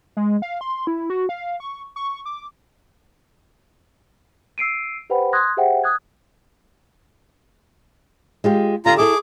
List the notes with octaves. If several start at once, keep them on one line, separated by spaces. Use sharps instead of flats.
G#3
F5
C6
E4
F#4
F5
C#6
C#6
D6
E6 C7 D7 D#7
G4 B4 C5 F#5 G5 B5
C6 D#6 F#6 G#6 A#6
G4 G#4 C5 E5 F#5 G5
D#6 F#6 G#6
G#3 F4 G4
D3 F4 G4 A#5
E4 G#4 A4 E5 D6